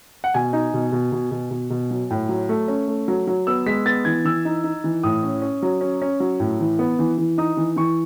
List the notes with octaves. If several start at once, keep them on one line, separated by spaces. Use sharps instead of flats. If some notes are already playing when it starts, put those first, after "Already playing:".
F#5
B2 G#5
D#4
B2
B2
B2
B2
B2
B2
F#3
A2
F#3
A3
C#4
A3
F#3
F#3
B3 E6
G#3 B6
B3 A6
E3 G#6
E3 E6
D#4
D#4
E3
A2 D#6
C#4
C#4
F#3
C#4
C#4
F#3
A2
E3
B3
E3
E3
D#4 D#6
E3
E3 C#6